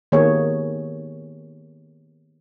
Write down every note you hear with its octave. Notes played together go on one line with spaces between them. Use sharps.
D#3 A#3 B3 G4 G#4 C#5